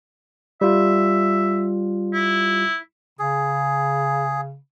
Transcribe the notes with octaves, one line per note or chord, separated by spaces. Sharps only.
G3 F4 E5
E4
C#3 G#4